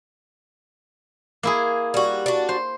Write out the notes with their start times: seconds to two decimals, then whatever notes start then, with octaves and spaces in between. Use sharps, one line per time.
1.43 A#3 E4 G#4
1.94 G3 F#4
2.26 D4 F#4
2.49 C5